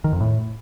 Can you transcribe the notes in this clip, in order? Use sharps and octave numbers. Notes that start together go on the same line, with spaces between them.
D#3
F2
A2